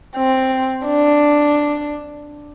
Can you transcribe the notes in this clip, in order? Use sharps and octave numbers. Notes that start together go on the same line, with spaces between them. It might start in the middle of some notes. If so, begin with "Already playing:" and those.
C4
D4